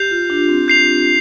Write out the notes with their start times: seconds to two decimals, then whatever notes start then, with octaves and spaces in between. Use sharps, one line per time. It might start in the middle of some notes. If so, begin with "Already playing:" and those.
Already playing: G4 G6 C7 F7
0.11 F4
0.30 D4
0.49 C4
0.68 G6 C7 F7